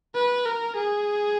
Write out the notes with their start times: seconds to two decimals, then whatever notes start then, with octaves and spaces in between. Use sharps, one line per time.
0.15 B4
0.46 A#4
0.76 G#4